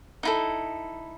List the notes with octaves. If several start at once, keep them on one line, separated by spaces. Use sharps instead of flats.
D#4 E4 A4